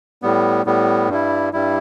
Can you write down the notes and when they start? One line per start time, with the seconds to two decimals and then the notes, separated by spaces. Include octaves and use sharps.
0.22 A2 G3 B3
0.66 A2 G3 B3
1.09 G2 G3 E4
1.53 G2 G3 E4